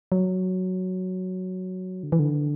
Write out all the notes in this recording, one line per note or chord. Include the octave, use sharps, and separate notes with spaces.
F#3
D3
E3
D3